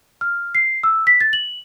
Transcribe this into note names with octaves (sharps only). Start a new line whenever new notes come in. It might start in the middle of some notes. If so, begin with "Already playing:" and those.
F6
C7
E6
B6
A6
F#7